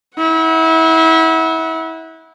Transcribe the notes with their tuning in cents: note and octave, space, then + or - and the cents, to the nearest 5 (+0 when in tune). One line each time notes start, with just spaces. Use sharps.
E4 -30 F#5 +0